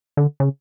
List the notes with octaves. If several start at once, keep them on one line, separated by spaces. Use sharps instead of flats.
D3
C#3